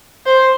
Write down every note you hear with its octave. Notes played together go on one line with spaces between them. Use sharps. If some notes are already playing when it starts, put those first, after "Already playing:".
C5